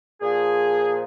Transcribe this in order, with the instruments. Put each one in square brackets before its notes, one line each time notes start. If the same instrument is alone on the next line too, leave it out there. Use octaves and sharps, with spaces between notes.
[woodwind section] A#2 F3 G#4